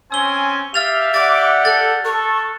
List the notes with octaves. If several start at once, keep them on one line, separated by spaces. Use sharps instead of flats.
C4 C#4 G#5 E6 G7
G4 E5 F5 F6 A6 F7
G4 D5 F#5 D6 A6
A4 F#6 A6
A4 C#6